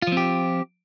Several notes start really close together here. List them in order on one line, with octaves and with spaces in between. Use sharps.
F4 F3 C4 G4